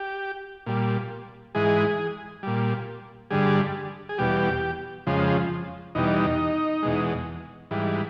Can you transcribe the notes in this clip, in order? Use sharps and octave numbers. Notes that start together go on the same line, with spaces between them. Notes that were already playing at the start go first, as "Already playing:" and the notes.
Already playing: G4
A#2 G3
G#2 E3 G#3 G#4
A#2 G3
G2 D3 G3 G#4
G#4
E2 B2 G3 G4
F2 C#3 F3 G#3
E2 B2 G3 D#4
E2 B2 G#3
G#2 E3 G3